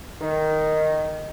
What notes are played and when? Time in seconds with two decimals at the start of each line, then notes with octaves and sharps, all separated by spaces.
0.21 D#3